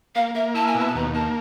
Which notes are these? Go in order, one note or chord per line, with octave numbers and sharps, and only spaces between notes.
A#3 F5
A#3 E5
E4 A5
G#5
B2 A5
A5
D#2 A#5
A#3 A5